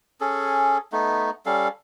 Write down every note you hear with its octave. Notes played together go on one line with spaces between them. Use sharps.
C#4 G#4 A4
A3 B3 D#4
G3 C#4 A4 F5